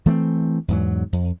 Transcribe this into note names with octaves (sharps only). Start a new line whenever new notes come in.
E3 A3 B3 C4
E2 G#2 F#3
F2